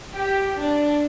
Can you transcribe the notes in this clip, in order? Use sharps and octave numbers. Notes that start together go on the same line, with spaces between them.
G4
D4